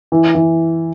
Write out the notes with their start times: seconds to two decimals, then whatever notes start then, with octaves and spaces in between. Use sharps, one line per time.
0.12 E3
0.35 E3